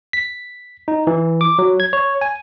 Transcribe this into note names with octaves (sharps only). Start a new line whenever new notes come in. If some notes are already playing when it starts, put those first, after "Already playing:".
B6
D#4
E3
D6
F#3
G#6
C#5
G#5